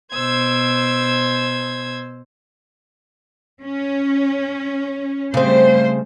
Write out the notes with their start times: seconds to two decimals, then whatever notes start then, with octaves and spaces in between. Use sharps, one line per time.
0.11 B2 C5 E6 G#6
3.62 C#4
5.34 C#3 G3 A3 C4 C5